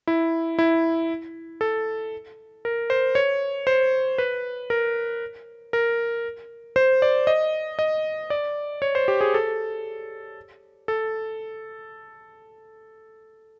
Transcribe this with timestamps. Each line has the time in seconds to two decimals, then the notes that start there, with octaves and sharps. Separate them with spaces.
0.07 E4
0.59 E4
1.61 A4
2.65 A#4
2.90 C5
3.15 C#5
3.67 C5
4.18 B4
4.70 A#4
5.73 A#4
6.76 C5
7.02 D5
7.27 D#5
7.79 D#5
8.30 D5
8.82 C#5
8.95 C5
9.08 G4
9.21 G#4
9.34 A4
10.88 A4